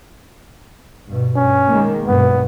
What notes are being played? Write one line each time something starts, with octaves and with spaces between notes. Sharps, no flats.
G2 B2
G2 C#4
D#3 G#3 A#3
B1 G2 B2 B3